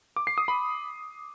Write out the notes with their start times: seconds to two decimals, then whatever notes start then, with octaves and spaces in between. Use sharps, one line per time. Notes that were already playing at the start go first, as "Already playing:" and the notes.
0.16 D6
0.27 C7
0.38 D#6
0.48 B5